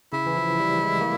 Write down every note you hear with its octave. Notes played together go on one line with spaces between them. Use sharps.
C#3 E4
E3
F3
G3
G#3
A#3